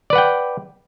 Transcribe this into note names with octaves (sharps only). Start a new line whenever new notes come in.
B4 D5 F#5 G5